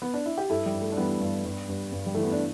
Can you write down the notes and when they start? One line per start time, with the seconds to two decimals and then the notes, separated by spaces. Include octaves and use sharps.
0.02 B3
0.14 D4
0.26 E4
0.38 G4
0.50 G2 E4 A4
0.66 G3
0.74 G2
0.81 A3
0.92 D4
0.97 E3 G3 B3
1.21 G2
1.45 G2
1.69 G2
1.92 G2
2.06 G3
2.15 E3 A3
2.23 B3
2.32 D4